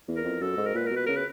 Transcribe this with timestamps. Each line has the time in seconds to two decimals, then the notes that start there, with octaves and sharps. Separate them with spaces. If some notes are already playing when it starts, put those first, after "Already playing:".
0.08 E2
0.16 A#4
0.24 F2
0.41 F#2 A4
0.57 G#2
0.66 A#4
0.74 A#2 B4
0.86 A#4
0.91 B2
0.96 B4
1.06 C#3 A#4
1.16 B4